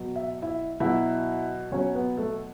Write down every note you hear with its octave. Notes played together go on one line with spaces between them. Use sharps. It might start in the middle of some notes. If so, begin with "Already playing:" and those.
Already playing: B2 F#3
E5
E4 E5
B2 E4 E5
F#3
B2 F#3 C#4 C#5
B3 B4
A3 A4